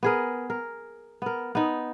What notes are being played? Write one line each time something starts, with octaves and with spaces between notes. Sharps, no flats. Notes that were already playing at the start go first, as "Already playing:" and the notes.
B3 G#4 A#4
A#4
B3 A#4
B3 D#4